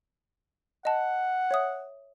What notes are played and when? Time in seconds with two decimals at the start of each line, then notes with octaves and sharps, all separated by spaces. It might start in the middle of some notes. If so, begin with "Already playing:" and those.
0.85 D#5 F#5 A5
1.51 C#5 E5 D#6